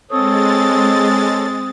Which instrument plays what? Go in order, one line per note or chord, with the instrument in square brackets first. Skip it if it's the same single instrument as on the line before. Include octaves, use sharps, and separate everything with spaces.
[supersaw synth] G#3 A6 [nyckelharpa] C4 [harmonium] A4 C#5 [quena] D#6